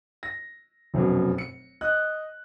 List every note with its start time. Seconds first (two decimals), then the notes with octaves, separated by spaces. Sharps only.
0.23 A#6
0.94 F1 F#2 B2
1.38 C#7
1.81 D#5 F#6